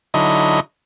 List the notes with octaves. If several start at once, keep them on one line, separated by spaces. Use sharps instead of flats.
D3 F#3 D#4 E4 D#5